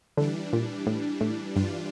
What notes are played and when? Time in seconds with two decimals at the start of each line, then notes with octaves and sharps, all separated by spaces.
0.17 D3 E3 G3 D4
0.53 A#2
0.87 A2
1.21 A2
1.56 G2 E3 G3 D4 F4